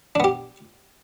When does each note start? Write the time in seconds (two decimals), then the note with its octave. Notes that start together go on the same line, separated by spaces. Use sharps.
0.15 D4
0.20 B3
0.24 G4